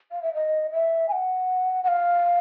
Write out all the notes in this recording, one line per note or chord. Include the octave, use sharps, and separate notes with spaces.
F5
E5
D#5
E5
G#5
F#5
F#5
F5